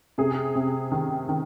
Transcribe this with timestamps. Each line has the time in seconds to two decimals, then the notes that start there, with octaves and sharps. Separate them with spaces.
0.18 C3 G#4
0.55 C3
0.92 D#3
1.29 D#3